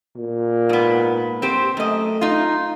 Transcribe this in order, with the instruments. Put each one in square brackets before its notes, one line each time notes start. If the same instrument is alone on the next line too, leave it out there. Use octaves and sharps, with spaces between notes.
[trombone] A#2
[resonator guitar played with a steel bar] G#2 B3
C4 G4 C5
[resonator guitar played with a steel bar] F#2 D#5 [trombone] A3
[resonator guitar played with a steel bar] D#4 F4